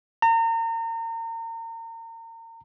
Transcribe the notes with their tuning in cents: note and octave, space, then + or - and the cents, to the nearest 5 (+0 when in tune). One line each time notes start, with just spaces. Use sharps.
A#5 -35